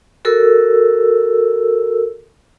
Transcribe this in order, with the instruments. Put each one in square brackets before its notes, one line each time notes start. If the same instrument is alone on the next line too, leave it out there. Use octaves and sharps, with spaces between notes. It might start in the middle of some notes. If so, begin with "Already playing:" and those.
[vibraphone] F#4 A4 A#4 E6